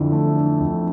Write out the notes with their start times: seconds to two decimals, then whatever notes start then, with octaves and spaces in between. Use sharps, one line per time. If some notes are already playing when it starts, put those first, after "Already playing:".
Already playing: F2 D3 E3
0.12 A3
0.37 D4
0.60 F2